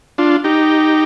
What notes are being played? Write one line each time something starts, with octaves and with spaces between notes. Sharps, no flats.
D4 F4
D#4 G4